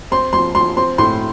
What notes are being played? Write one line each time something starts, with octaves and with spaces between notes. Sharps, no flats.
C4 C6
F3 C6
F3 C6
C4 C6
A2 C6